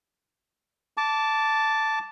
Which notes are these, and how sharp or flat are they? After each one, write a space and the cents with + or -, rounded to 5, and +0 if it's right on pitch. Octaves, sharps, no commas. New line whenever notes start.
A5 +0 D6 -15